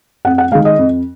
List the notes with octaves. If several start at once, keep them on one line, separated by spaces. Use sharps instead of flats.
F2 F#5
F#5
D#3 G#3 F5
D#5
F2